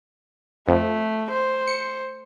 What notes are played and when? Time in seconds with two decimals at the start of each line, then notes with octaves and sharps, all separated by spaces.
0.68 F2 A3
1.31 C5
1.67 C#7